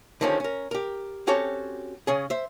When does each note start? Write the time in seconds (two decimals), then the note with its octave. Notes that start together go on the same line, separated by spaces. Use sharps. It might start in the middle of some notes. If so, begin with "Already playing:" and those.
0.21 D3 D#3 F3 G3 C#4
0.40 C#4 A#4
0.71 G4 A#4
1.27 C4 C#4 F#4 G4 A4 C#5
2.07 C#3 C#4 G#4
2.30 C5 E5